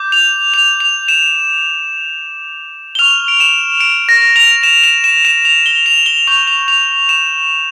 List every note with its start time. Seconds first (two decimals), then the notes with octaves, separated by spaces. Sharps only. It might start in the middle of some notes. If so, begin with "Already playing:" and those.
Already playing: D6 G6
0.12 F7
0.54 F7
0.80 F7
1.08 E7
2.95 G7
2.99 C#6 F6 F7
3.28 D7
3.40 E7
3.81 D7
4.09 A#6
4.36 F7
4.63 E7
4.84 E7
5.04 E7
5.25 E7
5.45 F7
5.66 G7
5.86 F7
6.06 G7
6.27 C#6 G6 F7
6.47 F7
6.68 F7
7.09 E7